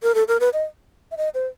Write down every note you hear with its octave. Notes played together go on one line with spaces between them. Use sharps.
A#4
A4
A#4
B4
D#5
E5
D#5
C5